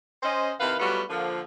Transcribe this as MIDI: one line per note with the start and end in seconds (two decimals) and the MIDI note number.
0.23 0.52 61
0.23 0.52 72
0.23 0.52 75
0.60 0.76 48
0.60 0.76 51
0.60 0.76 64
0.60 0.76 71
0.60 0.76 77
0.80 1.02 54
0.80 1.02 55
0.80 1.02 57
0.80 1.02 59
0.80 1.02 65
0.80 1.02 66
1.10 1.41 50
1.10 1.41 53
1.10 1.41 58